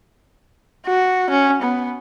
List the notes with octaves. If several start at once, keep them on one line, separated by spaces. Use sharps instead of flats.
F#4
C#4
B3